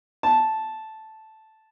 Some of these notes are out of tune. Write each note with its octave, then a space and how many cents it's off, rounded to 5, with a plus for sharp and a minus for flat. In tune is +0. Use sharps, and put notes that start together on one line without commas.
A5 -5